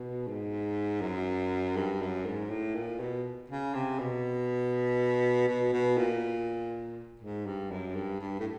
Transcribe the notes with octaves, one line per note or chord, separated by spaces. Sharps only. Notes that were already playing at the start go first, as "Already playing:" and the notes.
Already playing: B2
G#2
F#2
G2
F#2
G#2
A2
A#2
B2
C#3
C3
B2
B2
B2
A#2
G#2
G2
F#2
G2
G2
A2